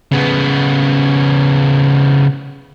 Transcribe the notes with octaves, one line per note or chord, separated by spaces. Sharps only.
C#3 B3